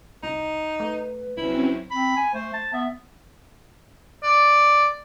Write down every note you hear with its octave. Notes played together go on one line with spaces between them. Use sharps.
C2 D#4
A3 B4
C2 F#3 C4 C#4 E4
C4 B5
G#5
A3 C5
A5
B3 E5
D5